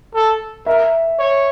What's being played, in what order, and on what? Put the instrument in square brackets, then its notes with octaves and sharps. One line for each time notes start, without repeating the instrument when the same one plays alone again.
[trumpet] A4
[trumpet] A#4 [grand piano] E5
[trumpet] C#5